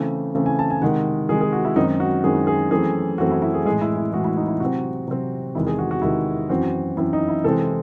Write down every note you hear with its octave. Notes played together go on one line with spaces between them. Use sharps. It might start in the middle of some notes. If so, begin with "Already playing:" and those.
Already playing: C#3 E3 A3 C4
C#3 E3 A3 C4
G#5
A5
G#5
C3 D#3 G#3 F#5
C3 D#3 G#3 G#4
G#4
F#4
E4
F#2 D#3 G#3 C4 D#4
F#4
F#2 D#3 G#3 C4 G#4
G#4
F#2 E3 A3 C4 G#4
F#2 E3 A3 C4 F#4
E4
E4
G#4
A2 E3 G#3 G#4
E4
E4
A2 E3 G#3 F#4
E4
D#4
E4
C3 F#3 C4 F#4
C3 F#3 C4
E2 C3 D#3 G#3 E4
G#4
F#4
F#4
E2 C3 D#3 G#3 E4
F#2 E3 C4 F#4
F#2 E3 C4 E4
D#4
E4
C3 E3 G#3 C4 A4